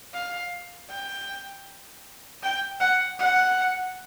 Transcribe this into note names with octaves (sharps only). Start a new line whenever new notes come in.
F5
G5
G5
F#5
F#5